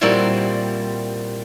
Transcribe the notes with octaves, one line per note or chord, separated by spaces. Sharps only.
A#2 G3 A#3 C4 E4 F#4